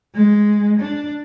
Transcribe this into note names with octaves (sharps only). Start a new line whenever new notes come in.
G#3
D4